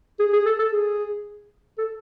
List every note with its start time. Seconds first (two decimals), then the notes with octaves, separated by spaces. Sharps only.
0.19 G#4
0.33 G#4
0.46 A4
0.59 A4
0.72 G#4
1.78 A4